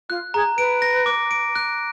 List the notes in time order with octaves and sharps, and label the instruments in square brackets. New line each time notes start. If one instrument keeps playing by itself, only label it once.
[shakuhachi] F4 [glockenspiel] F#6
[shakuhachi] G#4 [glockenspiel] A#5
[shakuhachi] B4 [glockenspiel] D7
[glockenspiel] A#6
D6
D7
F#6